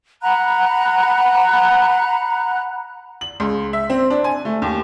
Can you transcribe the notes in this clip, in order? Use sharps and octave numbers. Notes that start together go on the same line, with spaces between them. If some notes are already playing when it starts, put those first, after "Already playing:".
F#5 A#5 B5 F#6
F#7
C#2
E5
C4
D4
G#5
A3
D#2